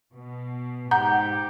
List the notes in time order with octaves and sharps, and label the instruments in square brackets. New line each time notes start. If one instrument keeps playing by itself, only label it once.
[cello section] B2
[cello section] G#2 G4 [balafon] F#5 [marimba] A#5 [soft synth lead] G6